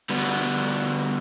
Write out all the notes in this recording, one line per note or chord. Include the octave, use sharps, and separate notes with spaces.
D3 G3 B3 D4 F#4